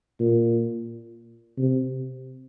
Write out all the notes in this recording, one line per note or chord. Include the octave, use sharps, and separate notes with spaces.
A#2
C3